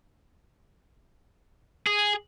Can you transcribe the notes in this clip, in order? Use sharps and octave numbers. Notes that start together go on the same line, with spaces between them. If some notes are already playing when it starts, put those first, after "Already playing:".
G#4